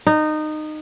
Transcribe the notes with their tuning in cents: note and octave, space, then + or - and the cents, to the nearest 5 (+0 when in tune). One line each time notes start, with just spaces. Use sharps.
D#4 -20